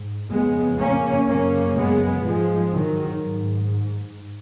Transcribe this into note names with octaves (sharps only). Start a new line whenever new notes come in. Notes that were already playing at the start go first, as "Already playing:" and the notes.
Already playing: G#2
F2 C#3 G#3 B3
A#3 C#4
F#2 C#3 A#3 C#4
G#3 B3
G#2 F3 G#3
D#3 F#3
G#2